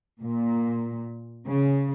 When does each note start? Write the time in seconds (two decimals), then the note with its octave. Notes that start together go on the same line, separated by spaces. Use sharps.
0.21 A#2
1.47 C#3